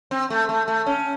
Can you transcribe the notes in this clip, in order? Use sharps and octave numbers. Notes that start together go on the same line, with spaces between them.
C4
A3
A3
A3
C#4